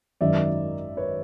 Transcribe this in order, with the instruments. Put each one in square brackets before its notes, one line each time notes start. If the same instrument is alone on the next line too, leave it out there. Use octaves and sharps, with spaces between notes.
[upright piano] G#1 F#2 D#3 [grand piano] D5 E5
[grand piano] B4 C#5